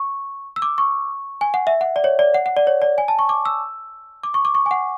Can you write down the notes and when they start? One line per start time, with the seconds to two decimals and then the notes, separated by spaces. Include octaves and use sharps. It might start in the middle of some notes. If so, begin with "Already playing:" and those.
Already playing: C#6
0.56 E6
0.62 D6
0.78 C#6
1.41 G#5
1.54 F#5
1.67 E5
1.81 F#5
1.96 D5
2.04 C#5
2.19 D5
2.34 F#5
2.46 F#5
2.57 D5
2.67 C#5
2.82 D5
2.98 G#5
3.08 A5
3.19 C#6
3.29 D6
3.45 E6
4.23 D6
4.34 C#6
4.45 D6
4.55 C#6
4.66 G#5
4.71 F#5